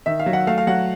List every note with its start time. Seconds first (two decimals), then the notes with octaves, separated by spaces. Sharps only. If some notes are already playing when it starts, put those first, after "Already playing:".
0.06 D#3 E5
0.20 F5
0.26 F#3
0.33 F#5
0.47 A3 F5
0.58 F5
0.67 F#3 F#5